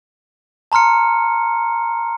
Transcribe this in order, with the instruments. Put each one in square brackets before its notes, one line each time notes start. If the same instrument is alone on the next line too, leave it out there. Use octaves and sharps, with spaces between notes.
[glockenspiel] A5 A#5 C6 F6 C#7